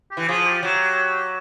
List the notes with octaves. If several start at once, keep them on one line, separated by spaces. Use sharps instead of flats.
G4
E3
F3 G#4
G4
F#3